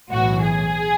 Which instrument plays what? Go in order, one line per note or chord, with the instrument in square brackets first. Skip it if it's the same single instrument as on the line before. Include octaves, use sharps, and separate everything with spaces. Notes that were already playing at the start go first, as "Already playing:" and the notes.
[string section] B1 A2 E3 F#4
G#4